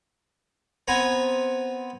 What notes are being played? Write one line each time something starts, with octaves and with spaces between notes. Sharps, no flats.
B3 C4 G#5 A#5